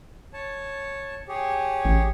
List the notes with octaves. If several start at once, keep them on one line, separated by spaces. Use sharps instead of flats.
C#5 A5
G4 G#4 C#5
A1